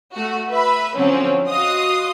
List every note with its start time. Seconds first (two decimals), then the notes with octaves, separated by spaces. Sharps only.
0.14 A3 F#4
0.49 B4 E5 B5
0.96 D3 F3 F#3 C4 C#4
1.48 F#4 D#5 F5 C6 D#6